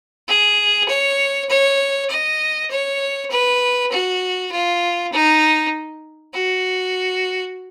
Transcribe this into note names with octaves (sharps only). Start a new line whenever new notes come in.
G#4
C#5
C#5
D#5
C#5
B4
F#4
F4
D#4
F#4